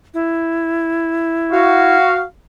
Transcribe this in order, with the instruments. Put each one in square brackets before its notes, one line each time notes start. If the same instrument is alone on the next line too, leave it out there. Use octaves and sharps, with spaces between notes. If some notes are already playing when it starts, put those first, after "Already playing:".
[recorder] E4
[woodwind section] F#4 F5